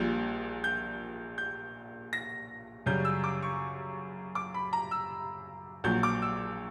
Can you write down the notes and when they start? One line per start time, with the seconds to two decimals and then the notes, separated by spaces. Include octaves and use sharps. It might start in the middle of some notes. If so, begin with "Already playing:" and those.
Already playing: A#1 A#2 G3 G6
0.64 G6
1.38 G6
2.13 A#6
2.86 F#2 C#3 G3 G6
3.05 E6
3.24 D6
3.43 C#6
4.35 D6
4.54 B5
4.73 A#5
4.91 E6
5.84 A#1 A#2 F#3 G6
6.03 D6
6.22 E6